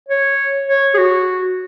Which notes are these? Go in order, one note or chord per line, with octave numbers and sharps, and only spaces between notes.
C#5
C#5
G#4
F#4